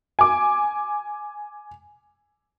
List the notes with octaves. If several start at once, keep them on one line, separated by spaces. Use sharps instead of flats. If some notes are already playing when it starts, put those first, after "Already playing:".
G#5 D6